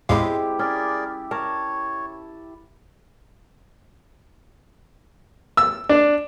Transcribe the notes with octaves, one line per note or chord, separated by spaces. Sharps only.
E2 A2 G#3 C4 E4 G4 F5
C#4 G#4 A#4 D5
A#4 C#5 A5
E6
D4